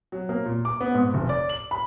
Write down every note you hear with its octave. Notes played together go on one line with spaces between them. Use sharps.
F#3
A#3
A#2
D6
B3
G#2
F1
D5
F#7
B5